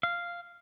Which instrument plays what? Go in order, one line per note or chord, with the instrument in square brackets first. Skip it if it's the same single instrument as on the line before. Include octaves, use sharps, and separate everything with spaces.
[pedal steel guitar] F5